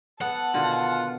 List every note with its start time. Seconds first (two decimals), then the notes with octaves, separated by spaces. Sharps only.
0.21 B3 A4 F#5 A5
0.54 B2 D3 D#3 F4